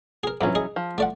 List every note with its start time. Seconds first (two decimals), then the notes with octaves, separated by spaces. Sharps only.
0.23 G#4 A#4
0.41 A#1 G2 E3 F#3 C#4
0.55 G#4 D#5
0.76 F3
0.98 A3 D5 F#5